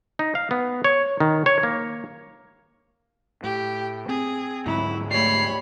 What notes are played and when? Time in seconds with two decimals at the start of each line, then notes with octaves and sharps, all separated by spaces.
0.19 D#4
0.35 F5
0.51 B3
0.84 C#5
1.20 D#3
1.46 C#5
1.63 A#3
3.44 A2 G4
4.09 C4 G#4
4.66 D2 G#2 F#3 E4 A#5
5.11 G3 A3 C#5 B5 C7